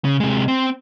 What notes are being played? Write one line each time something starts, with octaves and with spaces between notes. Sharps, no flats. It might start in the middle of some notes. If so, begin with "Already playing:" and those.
C#3
C3 G#3
C4